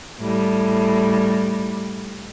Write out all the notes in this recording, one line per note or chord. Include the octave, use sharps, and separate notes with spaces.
A2 G3